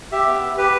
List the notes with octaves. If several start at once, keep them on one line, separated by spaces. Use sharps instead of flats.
G4 E5
B3
G4
G4 B4